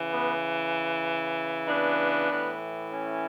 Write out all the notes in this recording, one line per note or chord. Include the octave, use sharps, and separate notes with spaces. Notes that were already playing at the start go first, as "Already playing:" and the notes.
Already playing: C#3 E3
B3
B3 D4
A2 E3
C#4